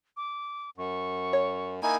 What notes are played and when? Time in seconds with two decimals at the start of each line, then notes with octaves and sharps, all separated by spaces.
0.17 D6
0.78 F#2 C#6
1.33 C#5
1.83 A#3 D#4 E4 G#5